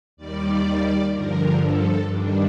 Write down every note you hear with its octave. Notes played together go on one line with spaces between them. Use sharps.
D#2 D#3 G3 D5
G2 D3 F3 A#4
A4
G2 D#3 G3 D4